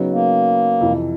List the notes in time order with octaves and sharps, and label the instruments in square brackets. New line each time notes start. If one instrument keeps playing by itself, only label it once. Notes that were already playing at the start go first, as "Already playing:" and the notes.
Already playing: [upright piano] C#3 F#3 B3 D#4
[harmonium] A#3
[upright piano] F2 C3 E3